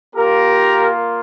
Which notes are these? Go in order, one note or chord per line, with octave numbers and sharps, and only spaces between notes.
A#3 F4 G4 A#4